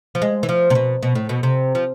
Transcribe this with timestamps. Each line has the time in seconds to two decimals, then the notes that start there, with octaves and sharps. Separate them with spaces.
0.15 F3
0.22 G#3
0.43 E3
0.49 F3
0.70 C3
0.75 B2
1.03 B2
1.15 A2
1.29 B2
1.43 C3
1.75 F3